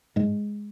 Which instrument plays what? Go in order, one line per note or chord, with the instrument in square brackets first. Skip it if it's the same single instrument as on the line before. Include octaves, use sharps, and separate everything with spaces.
[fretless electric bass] G#2 G#3